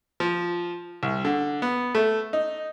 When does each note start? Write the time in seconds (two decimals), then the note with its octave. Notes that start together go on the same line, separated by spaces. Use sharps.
0.20 F3
1.03 C2
1.25 D3
1.62 B3
1.95 A3
2.33 D#4